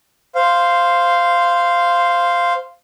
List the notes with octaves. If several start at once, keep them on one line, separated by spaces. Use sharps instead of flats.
C5 F5